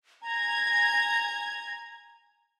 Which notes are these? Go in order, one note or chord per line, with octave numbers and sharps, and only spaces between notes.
G#5 A#5 G#6